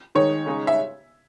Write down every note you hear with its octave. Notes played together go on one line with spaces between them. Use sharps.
D#3 G#3 D#4 C#5
C#3 G#3 D#4
E5